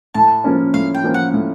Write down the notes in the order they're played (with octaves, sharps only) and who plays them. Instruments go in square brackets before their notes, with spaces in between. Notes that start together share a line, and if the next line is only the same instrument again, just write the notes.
[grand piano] A2 [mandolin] A5
[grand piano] F3 A#3 C#4
[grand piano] A2 [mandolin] F5
[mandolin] G5
[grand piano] F3 A#3 C#4
[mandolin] F#5
[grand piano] A2